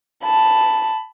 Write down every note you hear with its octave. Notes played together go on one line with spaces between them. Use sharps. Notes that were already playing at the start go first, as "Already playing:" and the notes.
A5 B5